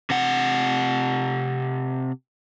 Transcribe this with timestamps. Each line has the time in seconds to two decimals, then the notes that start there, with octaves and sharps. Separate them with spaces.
0.10 C3 F#5